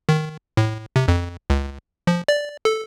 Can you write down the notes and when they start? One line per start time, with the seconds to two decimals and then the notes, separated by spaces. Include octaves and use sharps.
0.09 D#3
0.57 A2
0.96 C3
1.08 F2
1.50 C#2
2.07 F3
2.28 D5
2.65 A4